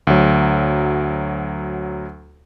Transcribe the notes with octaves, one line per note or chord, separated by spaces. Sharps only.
D2 F#3